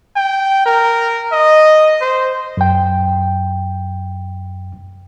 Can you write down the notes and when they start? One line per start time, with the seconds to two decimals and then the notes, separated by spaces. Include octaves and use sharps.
0.16 G5
0.66 A#4
1.32 D#5
2.01 C5
2.57 F#2 G5